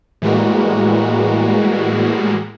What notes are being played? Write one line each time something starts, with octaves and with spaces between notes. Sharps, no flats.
A2 E3 G3 G#3 A#3 F#4